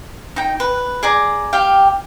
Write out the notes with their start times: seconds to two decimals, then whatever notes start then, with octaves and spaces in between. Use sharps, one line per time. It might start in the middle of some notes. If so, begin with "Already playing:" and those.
0.36 D#4 G5
0.60 B4
1.03 G#4 D5 A#5
1.53 G4 F5 G5